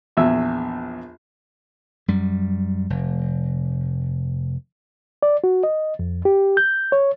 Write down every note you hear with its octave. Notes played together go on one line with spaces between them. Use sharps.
A#1 E2 E5 E6
F#2 G3
F1
D5
F#4
D#5
F2
G4
G6
C#5